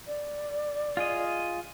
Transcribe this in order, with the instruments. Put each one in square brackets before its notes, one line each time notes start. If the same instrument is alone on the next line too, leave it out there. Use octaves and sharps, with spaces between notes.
[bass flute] D5
[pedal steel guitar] F4 G#4 D#5